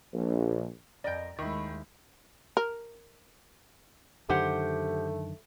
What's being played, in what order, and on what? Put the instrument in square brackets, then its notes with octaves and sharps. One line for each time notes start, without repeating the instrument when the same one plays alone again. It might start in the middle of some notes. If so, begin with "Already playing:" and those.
[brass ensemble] A#1
[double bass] F2 [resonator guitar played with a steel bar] A#4 D#5 G5 [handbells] D5 G6
[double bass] D#2 G#3 [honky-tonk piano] D#3 [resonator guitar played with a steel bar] A3 E4
[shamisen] A#4
[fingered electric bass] F#2 D3 D#3 [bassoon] A3 [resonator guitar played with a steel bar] G4 C5 F#5